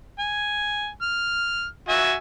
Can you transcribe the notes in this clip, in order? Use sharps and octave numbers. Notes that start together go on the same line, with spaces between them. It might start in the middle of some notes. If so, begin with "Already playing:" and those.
G#5
F6
F#4 E5 G#5